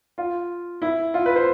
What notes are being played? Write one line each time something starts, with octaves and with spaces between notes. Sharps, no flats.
F4
E4
F4
B4
C5